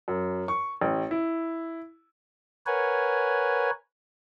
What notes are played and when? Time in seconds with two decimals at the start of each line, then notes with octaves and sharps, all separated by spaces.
0.08 F#2
0.48 C#6
0.82 A1
1.11 E4
2.66 A#4 B4 C#5 F#5 G#5